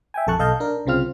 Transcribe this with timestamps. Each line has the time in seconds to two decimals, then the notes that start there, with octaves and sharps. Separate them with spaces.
0.14 E5 G5 G#5
0.27 A#1 F2 A4 A5 C#6 F#6
0.39 B1 A4 D#5 F5 A5 G6
0.60 D4 A#4
0.86 C2 C#3 C4 F4 F6